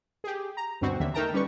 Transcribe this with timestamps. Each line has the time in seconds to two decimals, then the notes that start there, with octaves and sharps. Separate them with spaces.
0.24 G4 G#4
0.57 A#5
0.81 D2 G2 B2 C4 F#4
1.00 D#2 D3 E5
1.14 A3 D#4 A#4 G5 A5 A#5
1.33 G3 C#4 B4 C#6